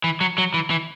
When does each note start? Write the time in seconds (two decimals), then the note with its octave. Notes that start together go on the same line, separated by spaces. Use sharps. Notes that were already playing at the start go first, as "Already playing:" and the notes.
0.04 E3
0.21 F#3
0.38 F#3
0.54 E3
0.70 E3